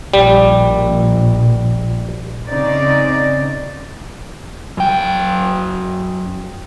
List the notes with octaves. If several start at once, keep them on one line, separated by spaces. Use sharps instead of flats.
A#1 G3
C#3 C4 D#4 D5
F#2 G5